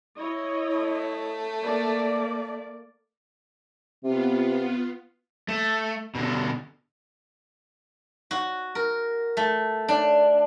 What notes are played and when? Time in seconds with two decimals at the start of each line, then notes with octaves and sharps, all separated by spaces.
0.17 E4 C#5 D#5
0.77 A3
1.61 A#3 D5
4.04 C3 B3 F4
5.48 A3
6.15 B2 D3
8.31 F#4
8.75 A#4
9.37 A3
9.88 D4